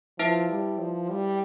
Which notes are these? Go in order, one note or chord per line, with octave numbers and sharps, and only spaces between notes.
F3 E4 B4 E5 A5
G3
F3
G3